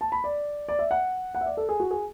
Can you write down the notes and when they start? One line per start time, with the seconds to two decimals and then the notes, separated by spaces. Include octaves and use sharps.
0.01 A5
0.12 B5
0.24 D5
0.68 D5
0.79 E5
0.91 F#5
1.35 F#5
1.41 E5
1.46 D5
1.57 A4
1.69 G#4
1.80 F#4
1.91 G#4